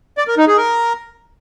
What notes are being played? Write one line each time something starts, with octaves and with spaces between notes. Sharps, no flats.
D5
A#4
D#4
G#4
A#4